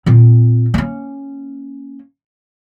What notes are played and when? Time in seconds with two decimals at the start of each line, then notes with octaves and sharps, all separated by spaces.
0.06 A#2 C4
0.74 A#3 C#4